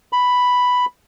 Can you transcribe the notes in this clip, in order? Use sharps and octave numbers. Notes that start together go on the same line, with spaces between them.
B5